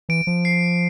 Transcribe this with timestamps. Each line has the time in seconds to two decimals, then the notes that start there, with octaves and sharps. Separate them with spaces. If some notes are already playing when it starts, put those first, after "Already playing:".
0.09 E3 D7
0.27 F3
0.45 C7